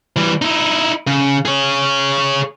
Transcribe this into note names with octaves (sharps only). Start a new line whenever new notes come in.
E3 G3
D#4 E4
C#3
G#4 C#5